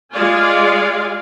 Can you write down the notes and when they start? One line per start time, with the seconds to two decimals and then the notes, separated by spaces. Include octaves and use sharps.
0.13 G#3 F4 G#4 D5 F5 G#5